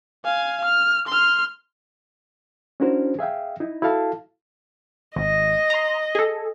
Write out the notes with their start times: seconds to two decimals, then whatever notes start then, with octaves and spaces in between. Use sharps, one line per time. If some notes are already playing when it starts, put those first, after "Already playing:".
0.25 F5 G#5
0.65 F6
1.08 C6 F6
2.80 C#4 D4 E4 F#4 A#4 C5
3.19 G#4 E5 F5 G5
3.60 D#4 E4
3.82 E4 F#4 A4 F5 A5
5.16 G#1 D#5
5.70 A#5 C6
6.15 G#4 A4